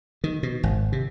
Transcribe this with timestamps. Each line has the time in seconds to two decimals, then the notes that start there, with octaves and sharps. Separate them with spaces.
0.24 D#3
0.43 B2
0.63 G#1
0.92 C3